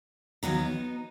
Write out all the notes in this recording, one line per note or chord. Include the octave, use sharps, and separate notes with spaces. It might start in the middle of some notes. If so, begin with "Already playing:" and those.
D#2 D#3 F#3 B3 D#4